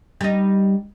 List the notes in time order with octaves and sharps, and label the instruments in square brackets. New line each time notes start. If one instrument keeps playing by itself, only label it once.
[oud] G3 D#4